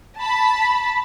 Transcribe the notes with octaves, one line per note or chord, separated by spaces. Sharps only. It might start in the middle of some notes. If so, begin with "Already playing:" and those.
A5 B5